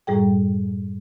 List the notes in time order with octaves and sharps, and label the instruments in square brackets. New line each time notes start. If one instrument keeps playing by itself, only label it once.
[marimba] F#2 A2 G3 G#4 G5